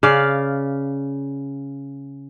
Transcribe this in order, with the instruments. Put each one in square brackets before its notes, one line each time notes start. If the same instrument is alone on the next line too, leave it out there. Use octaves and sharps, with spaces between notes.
[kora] C#3 D5 F5